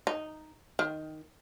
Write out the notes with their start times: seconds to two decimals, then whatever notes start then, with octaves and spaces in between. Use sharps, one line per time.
0.07 D#4
0.79 D#3